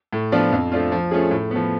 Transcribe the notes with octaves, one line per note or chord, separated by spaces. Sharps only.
A2
F3 B3 D4 F4
F2
F3 A3 D4 F4
F3
A3 C#4 F4 G#4
A2
F3 B3